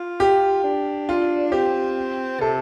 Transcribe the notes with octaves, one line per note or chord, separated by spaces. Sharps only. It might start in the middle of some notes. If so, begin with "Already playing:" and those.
Already playing: F4
G4
D4
F4
C4 G4
C3 A4